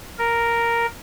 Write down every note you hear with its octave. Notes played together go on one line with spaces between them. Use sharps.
A#4